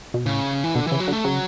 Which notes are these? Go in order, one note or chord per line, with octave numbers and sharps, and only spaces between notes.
B2
A2 C#3
E3
B2 D3
C#3 E3
F#3
D3
A3
C#3 F#3